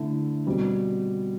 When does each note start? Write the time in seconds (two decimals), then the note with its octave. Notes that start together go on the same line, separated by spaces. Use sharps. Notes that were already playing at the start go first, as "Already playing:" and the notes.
Already playing: D3 A3 E4
0.46 B2 G3 C4